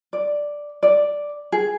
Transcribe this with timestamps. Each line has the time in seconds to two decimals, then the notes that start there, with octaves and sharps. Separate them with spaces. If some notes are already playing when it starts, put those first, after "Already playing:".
0.13 D5
0.83 D5
1.52 G#4